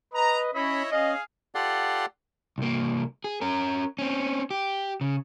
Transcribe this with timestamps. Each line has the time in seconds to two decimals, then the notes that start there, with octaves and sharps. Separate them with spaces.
0.13 B4 D#5 A#5
0.54 C#4 E4 C#5 D#5 B5
0.91 C#4 G#4 D#5 F5
1.55 F4 G4 A4 D5 F#5 C6
2.58 C2 A#3
3.24 G#4
3.41 C#4 A#4
3.99 C4 C#4
4.51 G4
5.01 C#3